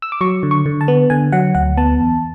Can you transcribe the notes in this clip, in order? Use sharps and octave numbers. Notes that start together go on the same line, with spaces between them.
E6
D6
F#3 C#6
D3
C#6
D3
A5
B3
D3 G#5
F#3 F#5
D2 F#5
B3 A5
E2